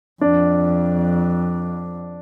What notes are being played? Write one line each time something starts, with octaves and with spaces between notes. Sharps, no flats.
F2 D4